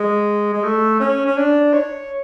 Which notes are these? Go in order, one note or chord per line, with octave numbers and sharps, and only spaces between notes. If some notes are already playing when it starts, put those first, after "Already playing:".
Already playing: G#3
G#3
A3
C#4
C#4
D4
C#5